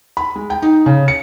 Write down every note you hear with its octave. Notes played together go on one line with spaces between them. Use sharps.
B5
G#3
G5
D#4
C#3
C#7